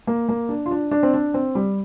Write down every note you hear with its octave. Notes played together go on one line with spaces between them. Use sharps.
A#3
A#3
D4
F4
D4
D4
C4
D4
C4
G3